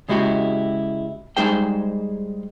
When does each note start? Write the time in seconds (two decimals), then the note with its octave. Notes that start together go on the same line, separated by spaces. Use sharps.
0.09 C#3 G#3 E4 F#4 G4
1.37 G3 G#3 D#4 G#4 C5 G5